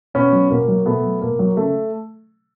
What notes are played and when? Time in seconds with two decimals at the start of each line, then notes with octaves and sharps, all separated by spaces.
0.14 B2 B3 C#4
0.32 F#3
0.50 B2 A#3
0.68 F#3
0.86 B2 A3 B3
1.03 F#3
1.21 B2 A#3
1.39 F#3
1.57 C#3 A3